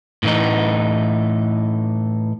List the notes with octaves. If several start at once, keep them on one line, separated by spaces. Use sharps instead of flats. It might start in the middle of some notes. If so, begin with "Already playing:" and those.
A2 E3 D#4